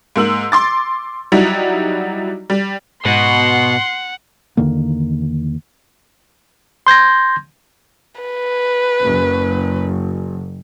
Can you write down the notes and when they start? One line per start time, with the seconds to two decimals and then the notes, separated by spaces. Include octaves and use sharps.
0.16 G#2 A#3 E6 F#7
0.52 C6 D6 A6
1.32 F#3 G3 D#4 E4 F#4
2.50 G3
3.05 G#2 B2 F#5 C6
4.57 E2 D3 D#3 A#3
6.87 C6 G6 G#6 A#6
8.21 B4
9.03 F#1